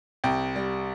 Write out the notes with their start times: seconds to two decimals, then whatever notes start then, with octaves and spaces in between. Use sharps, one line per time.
0.24 C2 G5
0.56 G3